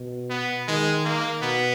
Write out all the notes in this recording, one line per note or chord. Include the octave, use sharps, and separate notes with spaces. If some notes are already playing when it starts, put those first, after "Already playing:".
Already playing: B2
B3
D#3 G#3
A#3
B2 B3